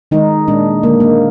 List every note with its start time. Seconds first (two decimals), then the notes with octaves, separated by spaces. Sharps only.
0.11 D#3 G#3 D#4
0.48 A#2 G#3 D4
0.83 D3 G#3 A#3
1.00 A#3